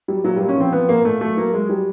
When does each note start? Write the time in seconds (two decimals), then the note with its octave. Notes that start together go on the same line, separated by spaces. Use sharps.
0.08 F#3 G3
0.24 A#2 F#3
0.36 G3
0.40 A#2
0.49 C#4
0.57 F3 C4
0.72 F3 B3
0.89 A#2 A#3
1.05 A#2 A3
1.21 F#3 A3
1.37 F#3 A#3
1.53 F#3 G#3
1.69 F#3 G3